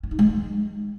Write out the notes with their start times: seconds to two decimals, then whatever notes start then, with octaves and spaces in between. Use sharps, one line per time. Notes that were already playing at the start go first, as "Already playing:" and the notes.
0.03 C#4
0.11 D#4
0.19 G#3